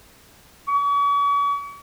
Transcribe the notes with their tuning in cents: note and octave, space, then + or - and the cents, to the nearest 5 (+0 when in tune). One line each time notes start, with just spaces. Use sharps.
C#6 +40